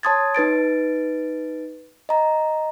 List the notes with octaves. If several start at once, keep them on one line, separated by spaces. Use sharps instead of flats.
C#5 A5 C6 D#6 G#6 A6
D#4 B4 A6 D7
D#5 A#5